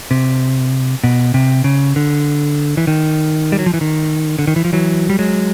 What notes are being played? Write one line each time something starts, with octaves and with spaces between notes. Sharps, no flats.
C3
B2
C3
C#3
D3
E3
D#3
G3
F#3
F3
E3
D#3
D3
D#3
E3
F3
E3 F#3
G3
F#3 G#3